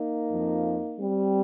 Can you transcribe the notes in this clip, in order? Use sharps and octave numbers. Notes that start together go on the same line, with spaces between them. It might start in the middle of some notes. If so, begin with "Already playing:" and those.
Already playing: A#3 D#4
F2 F3
G3 C4